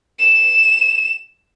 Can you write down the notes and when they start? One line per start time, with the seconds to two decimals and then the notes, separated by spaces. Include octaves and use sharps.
0.19 E7